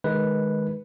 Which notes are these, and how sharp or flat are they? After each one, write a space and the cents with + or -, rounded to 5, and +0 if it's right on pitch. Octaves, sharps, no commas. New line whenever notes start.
D#3 +0 G#3 +15 B4 -5